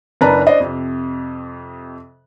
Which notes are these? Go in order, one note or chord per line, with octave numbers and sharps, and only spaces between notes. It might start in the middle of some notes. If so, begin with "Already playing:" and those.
F#1 D4 B4 A5 A#5
D4 C5 D5 D#5
F2 C3